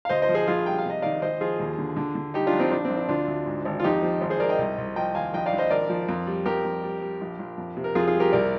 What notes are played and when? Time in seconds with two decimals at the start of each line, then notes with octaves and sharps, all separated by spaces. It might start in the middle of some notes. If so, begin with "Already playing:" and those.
0.05 F5
0.09 D2 C5 D#5
0.22 C5 D#5
0.29 F3
0.35 G#4 C5
0.47 A#1 F4 G#4
0.66 G3 G5
0.78 F5
0.85 C3 D#5
1.02 D#3 D5 F5
1.22 G#1 C5 D#5
1.41 F3 F4 G#4
1.60 D#2
1.78 D3
1.97 D3
2.15 D3
2.34 G3 D#4 G4
2.47 D4 F4
2.53 A#1
2.59 C4 D#4
2.71 A#1 D4
2.85 C4
2.90 A#1
2.97 D4
3.09 D2 D4 F4
3.28 D2
3.46 G#2
3.65 G#1
3.80 F4
3.84 F2 D#4 G4
4.02 F3
4.21 G#1
4.30 G#4 C5
4.40 G#1 A#4 D5
4.49 D#5 G5
4.58 C2
4.78 C2
4.96 F3 D#5 G5
5.15 D#2 F5 G#5
5.34 A#1 D#5 G5
5.46 D5 F5
5.53 A#1
5.58 C5 D#5
5.70 G#1 A#4 D5
5.90 F3
6.09 F2
6.27 G3
6.45 F2 G4 A#4
6.65 F2
6.83 G3
7.02 G3
7.21 A#1
7.39 A#1
7.58 F2
7.77 C3
7.84 A#4
7.95 F2 F4 G#4
8.07 F4 G#4
8.14 G3
8.20 G4 A#4
8.32 C2 A#4 D5